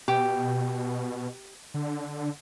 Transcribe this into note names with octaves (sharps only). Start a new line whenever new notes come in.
B2 G4
D3